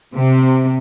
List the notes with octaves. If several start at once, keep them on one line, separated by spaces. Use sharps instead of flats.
C3